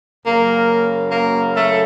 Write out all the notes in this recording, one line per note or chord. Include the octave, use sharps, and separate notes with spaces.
F#2 C#3 F#3 A#3 A#4
A#3 A#4
A3 A4